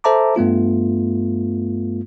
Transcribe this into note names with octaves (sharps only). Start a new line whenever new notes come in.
A4 C5 E5 A5 A#5 D6
G2 A3 B3 F4